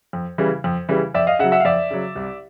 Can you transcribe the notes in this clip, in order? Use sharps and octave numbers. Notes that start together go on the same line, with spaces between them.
F2
C#3 E3 G3
F2
C#3 E3 G3
F2 D5 E5
D#5 F5
C#3 F#3 E5 F#5
E5 F#5
F5
F2 D5 E5
C#3 F#3
C2